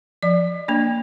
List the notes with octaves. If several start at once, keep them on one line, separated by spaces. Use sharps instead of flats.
F3 D5
A#3 D4